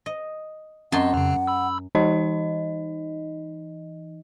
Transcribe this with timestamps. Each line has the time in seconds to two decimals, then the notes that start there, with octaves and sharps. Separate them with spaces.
0.06 D#5
0.92 F#2 C4 D#5 F#5 A5 C6
1.14 F2 C#3
1.47 B5 E6
1.95 E3 D#4 D#5